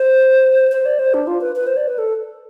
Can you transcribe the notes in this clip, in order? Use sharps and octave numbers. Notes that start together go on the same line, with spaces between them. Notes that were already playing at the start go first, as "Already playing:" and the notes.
Already playing: C5
C5
D5
C5
D4
F4
B4
B4
C5
D5
B4
A4